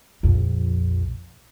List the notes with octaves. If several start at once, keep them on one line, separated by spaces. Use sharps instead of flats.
A#1 F2